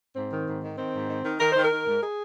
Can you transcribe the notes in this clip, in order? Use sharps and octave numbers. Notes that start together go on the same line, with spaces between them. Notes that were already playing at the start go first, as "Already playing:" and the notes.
G#2 C4
D#3
G#2
D#3
D#3 C4
G#2
D#3
D#3
D#3 A#4
D#3 C5
A#4
D#3
G#2
G#4